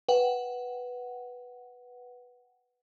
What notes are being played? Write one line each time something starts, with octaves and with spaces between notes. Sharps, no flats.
B4 F#5 G5